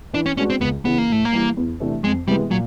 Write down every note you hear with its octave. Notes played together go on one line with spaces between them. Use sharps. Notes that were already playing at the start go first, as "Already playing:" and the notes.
E3 D4
C#4
G#3 B3 C#4 D4 F#4
C4
C#2 B3
C#3 E3 B3
A#3
A2 A3
A#3
E3 G3
E2
C3 E3 A3 D4
F2 G#3
C3 E3 G3 G#3 B3
A#2 F#3